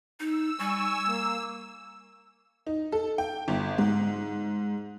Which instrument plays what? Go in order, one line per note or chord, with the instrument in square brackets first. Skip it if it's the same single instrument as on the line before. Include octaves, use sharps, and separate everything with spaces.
[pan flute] D#4 [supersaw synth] E6
[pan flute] G3 [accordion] G#5 C#6
[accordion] A#3
[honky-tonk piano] D#4
A4
G5
G1
G#2